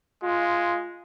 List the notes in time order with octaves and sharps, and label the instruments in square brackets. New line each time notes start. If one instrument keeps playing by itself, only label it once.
[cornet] G#3 [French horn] F4